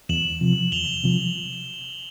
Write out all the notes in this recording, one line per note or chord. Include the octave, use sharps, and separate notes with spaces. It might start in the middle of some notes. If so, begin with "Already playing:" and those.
E2 E7 F#7
C3 F3
E2 F7 G7
C3 F3